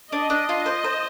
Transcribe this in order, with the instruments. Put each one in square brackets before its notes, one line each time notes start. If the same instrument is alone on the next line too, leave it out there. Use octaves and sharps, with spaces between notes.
[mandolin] D4 [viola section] D#5
[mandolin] D4
F4
C5
C5